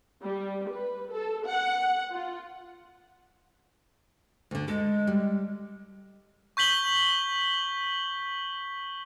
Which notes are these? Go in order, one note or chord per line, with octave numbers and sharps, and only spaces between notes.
G3
B4
A4
F#5
F4
D2 D3
G#3 A4
G3
C#6 G6 B6 F#7 G7